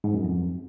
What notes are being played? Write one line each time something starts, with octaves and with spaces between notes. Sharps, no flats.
G#2
F#2
F2